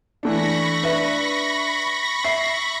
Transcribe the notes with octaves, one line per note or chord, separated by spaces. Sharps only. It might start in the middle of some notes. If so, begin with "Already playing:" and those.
E3 A3 D4 B5 C#6 A#6
D4 B4 E5
E5 C7